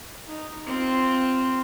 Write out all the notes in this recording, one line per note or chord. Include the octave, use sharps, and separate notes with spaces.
D#4
C4 F4